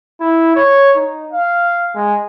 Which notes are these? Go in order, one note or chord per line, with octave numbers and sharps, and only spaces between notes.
E4
C#5
D#4
F5
G#3